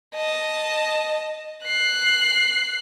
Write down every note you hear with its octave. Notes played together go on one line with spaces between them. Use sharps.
D#5 A5
F#6 C7